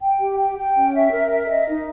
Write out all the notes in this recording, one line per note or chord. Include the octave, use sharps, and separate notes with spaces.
G5
G4
G5
G5
C#4
E5
A#4
E5
D#5
D#4